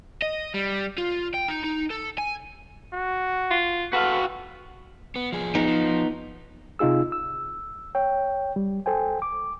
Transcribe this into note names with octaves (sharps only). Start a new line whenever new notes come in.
D#5
G3
F4
G5
D#4
D#4
A4
G#5
F#4
F4
F#4 A4 B4 F5
B3
F3 G#4
B3 D#4
F3
C3 D#4 F4 G#4 E6
E6
C#5 G5
G3
A4 C5 G5 G#5
D6